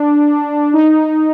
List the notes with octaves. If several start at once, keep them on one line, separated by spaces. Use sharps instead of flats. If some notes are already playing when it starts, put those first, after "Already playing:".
Already playing: D4
D#4